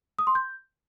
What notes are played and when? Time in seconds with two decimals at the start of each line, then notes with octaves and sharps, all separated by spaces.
0.19 D#6
0.27 C6
0.35 G6